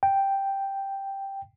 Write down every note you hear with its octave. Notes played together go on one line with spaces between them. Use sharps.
G5